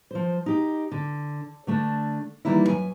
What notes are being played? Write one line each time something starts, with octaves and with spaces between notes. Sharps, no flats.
F3 C5
D#4 G4
D3
D3 A3 D4
D#3 E3 F#3 G3 A#3 E4
F#2 G#5